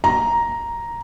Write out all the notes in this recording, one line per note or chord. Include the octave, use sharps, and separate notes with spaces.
A#5